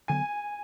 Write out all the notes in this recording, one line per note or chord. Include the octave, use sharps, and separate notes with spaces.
D3 F#3 B3 G#5